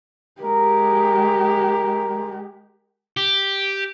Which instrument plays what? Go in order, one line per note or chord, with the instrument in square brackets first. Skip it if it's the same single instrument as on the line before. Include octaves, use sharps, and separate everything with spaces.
[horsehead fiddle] G#3 G4 [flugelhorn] A#4
[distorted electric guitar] G4